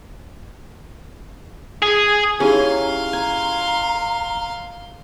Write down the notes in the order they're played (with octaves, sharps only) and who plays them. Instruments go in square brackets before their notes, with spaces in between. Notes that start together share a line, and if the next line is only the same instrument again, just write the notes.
[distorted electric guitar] G#4
[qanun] C#4 E4 [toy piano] D#4 G4 G#4 [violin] F5 C6 [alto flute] A#5
[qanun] G#5 [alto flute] A#5